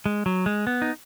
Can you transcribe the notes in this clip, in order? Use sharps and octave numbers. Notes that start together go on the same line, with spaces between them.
G#3
F#3
G#3
B3
D#4